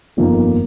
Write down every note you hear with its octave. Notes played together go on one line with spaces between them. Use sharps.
G1 F2 D#3 A#3 D#4